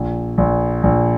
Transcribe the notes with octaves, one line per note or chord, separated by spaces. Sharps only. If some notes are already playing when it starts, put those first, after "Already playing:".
Already playing: A#1
A#1
A#1